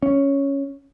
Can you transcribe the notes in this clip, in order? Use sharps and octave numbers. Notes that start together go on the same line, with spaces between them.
C#4